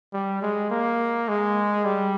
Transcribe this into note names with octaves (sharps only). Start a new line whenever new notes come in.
G3
G#3
A#3
G#3
G3